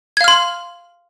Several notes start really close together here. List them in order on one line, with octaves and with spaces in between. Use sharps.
G#6 F5 F6 C6